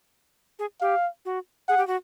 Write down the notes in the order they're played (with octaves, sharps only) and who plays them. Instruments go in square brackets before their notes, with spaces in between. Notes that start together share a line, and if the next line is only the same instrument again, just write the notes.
[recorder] G#4
[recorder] G4 [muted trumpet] F5
[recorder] F#4
[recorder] G#4 [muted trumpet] F#5
[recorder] G4
F#4